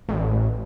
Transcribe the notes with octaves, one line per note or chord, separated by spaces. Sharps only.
A1